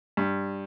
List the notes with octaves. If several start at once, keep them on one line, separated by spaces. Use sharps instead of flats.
G2